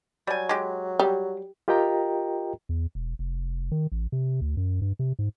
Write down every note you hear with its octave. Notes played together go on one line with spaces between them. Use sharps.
F#3 G3 G#5
G#3 G4
G3
F4 G4 A#4 D#5 G5 A#5
E2
E1
F1
D#3
A1
C3
D2
F#2
G2
C3
G#2